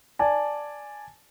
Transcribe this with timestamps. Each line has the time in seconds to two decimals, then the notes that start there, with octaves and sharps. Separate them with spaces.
0.19 D5 G#5 A5